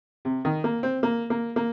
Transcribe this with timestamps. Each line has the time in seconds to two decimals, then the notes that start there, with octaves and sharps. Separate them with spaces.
0.25 C3
0.45 D#3
0.64 A#3
0.83 C4
1.03 A#3
1.30 A#3
1.56 A#3